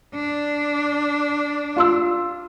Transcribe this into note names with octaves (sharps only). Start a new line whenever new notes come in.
D4
F4 C6 E6